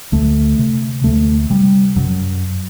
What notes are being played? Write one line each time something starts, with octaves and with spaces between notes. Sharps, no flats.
D2 A3
C3
D2 A3
C3 G3
F#2 F#3